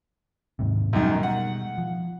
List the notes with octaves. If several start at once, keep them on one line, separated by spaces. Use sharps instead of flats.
D#2 G#2 C3
F#2 B2 D#3 G3 G#3
F#5
F3